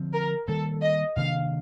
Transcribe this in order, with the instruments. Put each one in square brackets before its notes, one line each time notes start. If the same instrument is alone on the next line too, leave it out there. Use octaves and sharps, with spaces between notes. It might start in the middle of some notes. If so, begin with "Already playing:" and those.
Already playing: [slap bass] D3 F3 C4
[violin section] A#4
[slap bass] D#3 G3 A#3 [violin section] A4
[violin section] D#5
[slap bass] C3 D#3 A#3 D4 [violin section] F5